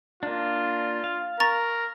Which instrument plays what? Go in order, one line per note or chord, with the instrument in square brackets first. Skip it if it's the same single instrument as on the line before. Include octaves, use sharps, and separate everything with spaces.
[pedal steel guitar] A#3 D4 [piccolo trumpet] F4
[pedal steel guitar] F5
[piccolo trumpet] A#4 [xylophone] A#5 C#6 A6